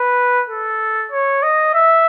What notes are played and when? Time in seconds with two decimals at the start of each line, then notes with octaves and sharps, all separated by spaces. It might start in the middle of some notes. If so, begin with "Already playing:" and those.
Already playing: B4
0.49 A4
1.12 C#5
1.43 D#5
1.74 E5